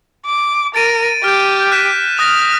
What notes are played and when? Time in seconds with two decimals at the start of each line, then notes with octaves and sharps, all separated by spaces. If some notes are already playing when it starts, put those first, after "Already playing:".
0.26 D6
0.75 A#4 A6 D7 D#7
1.24 G4 F6 G6
1.72 F#6 B6 E7
2.19 D#6 F6 F#6 A#6